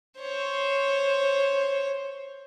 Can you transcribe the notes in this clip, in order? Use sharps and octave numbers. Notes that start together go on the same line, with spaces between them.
C5 C#5